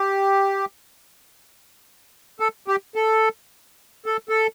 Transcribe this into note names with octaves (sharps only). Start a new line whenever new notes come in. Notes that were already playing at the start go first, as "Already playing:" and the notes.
Already playing: G4
A4
G4
A4
A4
A4